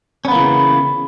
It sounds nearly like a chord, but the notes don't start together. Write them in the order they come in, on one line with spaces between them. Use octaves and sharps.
C#4 B3 A#3 E3 C#3